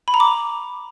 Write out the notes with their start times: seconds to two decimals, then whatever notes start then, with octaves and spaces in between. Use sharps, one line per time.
0.08 B5
0.14 A#5
0.20 D6